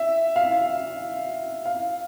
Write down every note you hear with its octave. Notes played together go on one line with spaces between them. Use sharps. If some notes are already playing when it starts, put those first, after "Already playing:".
Already playing: E5
F5
F5